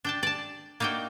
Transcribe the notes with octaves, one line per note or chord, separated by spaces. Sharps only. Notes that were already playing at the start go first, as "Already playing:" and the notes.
D4 G5 A5
D5 A5
A#3 D4 D#4 F#4 G5